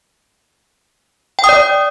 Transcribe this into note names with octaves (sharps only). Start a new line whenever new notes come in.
G5
D#6
D5